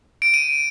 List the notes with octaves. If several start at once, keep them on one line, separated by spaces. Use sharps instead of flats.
D7
D#7